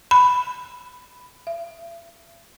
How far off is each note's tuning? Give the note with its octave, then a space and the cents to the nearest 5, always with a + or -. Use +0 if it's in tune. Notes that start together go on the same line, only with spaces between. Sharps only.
B5 +5
E5 +40